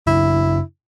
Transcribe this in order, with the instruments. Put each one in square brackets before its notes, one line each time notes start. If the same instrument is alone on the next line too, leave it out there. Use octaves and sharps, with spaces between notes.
[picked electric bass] F#2 C#3 D4 [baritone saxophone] E4